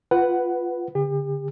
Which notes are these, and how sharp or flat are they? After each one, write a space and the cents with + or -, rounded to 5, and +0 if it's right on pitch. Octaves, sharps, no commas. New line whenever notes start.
F4 +0 B4 +0 F#5 +10
D3 -40 G4 +40